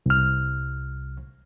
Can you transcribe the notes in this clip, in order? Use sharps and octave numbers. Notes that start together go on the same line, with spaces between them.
C2 F6